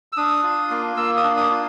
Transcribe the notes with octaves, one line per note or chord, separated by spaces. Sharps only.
E6
D4 D#6
F4
A#3
A#3 E6
D#6
D4
D#6
F4